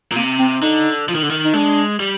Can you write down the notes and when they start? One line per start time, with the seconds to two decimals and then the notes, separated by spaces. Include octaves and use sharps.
0.12 A#2
0.16 C3 A#3
0.39 C4
0.62 D3 D#4
1.09 F3
1.15 D#3
1.23 D3
1.30 D#3
1.45 D#4
1.53 G#3 D4
2.00 G3